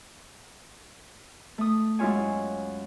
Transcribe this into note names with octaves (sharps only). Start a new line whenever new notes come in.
A3 D#6
F#2 G#3 E4 F4 C#5 G#5